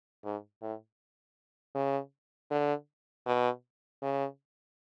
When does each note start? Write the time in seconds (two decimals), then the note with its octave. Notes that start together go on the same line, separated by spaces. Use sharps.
0.25 G#2
0.62 A2
1.75 C#3
2.51 D3
3.26 B2
4.02 C#3